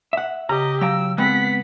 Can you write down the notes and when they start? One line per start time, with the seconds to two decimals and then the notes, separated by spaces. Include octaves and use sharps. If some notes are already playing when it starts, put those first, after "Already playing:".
0.13 E5 F#5
0.49 C#3 G4 D#5 A#5
0.81 F#3 F5 G5 A#5 E6
1.18 G#3 B3 C4 F#5 G5 B5 F#6 B6